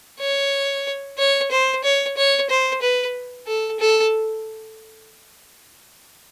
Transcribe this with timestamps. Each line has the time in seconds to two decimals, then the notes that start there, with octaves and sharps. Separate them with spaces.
0.20 C#5
1.18 C#5
1.51 C5
1.84 C#5
2.17 C#5
2.50 C5
2.82 B4
3.47 A4
3.80 A4